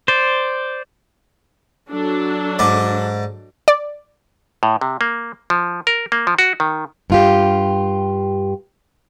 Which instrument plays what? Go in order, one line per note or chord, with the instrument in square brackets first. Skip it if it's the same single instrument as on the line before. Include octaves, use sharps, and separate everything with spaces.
[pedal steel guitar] C5 D5
[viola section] F#3 D4 A4
[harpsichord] G#2 D5
[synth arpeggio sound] D5
[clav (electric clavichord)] A2
C3
A#3
F3
A#4
A#3
F3
F#4
D#3
[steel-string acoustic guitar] G2 F4 G4